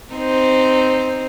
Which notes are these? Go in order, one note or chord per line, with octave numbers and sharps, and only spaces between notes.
C4 D#4 C5